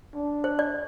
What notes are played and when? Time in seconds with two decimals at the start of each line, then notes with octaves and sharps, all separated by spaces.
0.14 D4
0.44 C5
0.59 D5